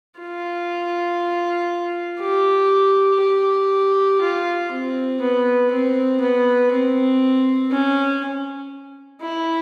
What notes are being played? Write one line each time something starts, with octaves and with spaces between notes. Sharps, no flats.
F4
G4
G4
F4
C4
B3
C4
B3
C4
C#4
E4